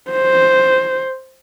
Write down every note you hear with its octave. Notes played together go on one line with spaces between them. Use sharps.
C5